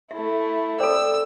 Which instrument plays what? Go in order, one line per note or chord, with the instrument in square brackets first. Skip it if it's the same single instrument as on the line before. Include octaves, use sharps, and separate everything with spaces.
[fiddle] A3 E4 [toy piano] E5
[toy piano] A4 C5 [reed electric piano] D5 G5 [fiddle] E6